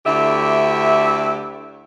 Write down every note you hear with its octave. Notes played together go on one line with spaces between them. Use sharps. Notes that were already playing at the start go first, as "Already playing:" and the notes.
D2 D3 E4 G4 E5